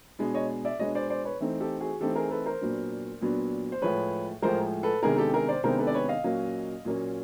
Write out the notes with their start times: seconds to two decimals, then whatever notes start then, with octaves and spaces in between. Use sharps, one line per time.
0.19 B2 G#3 B3 D4
0.34 C#5 D#5
0.65 D5 E5
0.79 B2 G#3 B3 D4 C#5 D#5
0.95 C5 D5
1.10 C5 D5
1.25 B4 C#5
1.40 E3 A3 C4 D#4
1.60 G4 A4
1.81 F#4 G#4
2.00 E3 A3 C4 D#4 G4 A4
2.16 G#4 A#4
2.31 A4 B4
2.46 A#4 C5
2.61 A#2 F#3 B3 D4
3.21 A#2 F#3 B3 D4
3.72 C5
3.82 A2 F3 G#3 B4 C#5
4.42 A2 F3 G#3 A#4 C5
4.83 A4 B4
5.03 C3 D#3 G#3 B3 D4 G#4 A#4
5.18 G4 A4
5.34 G#4 A#4
5.48 C5 D5
5.63 C3 D#3 G#3 B3 D4 A#4 C5
5.79 A4 B4
5.87 D5
5.94 B4 C#5
6.09 D#5 F5
6.24 A#2 F#3 A#3 C#4
6.85 A#2 F#3 A#3 C#4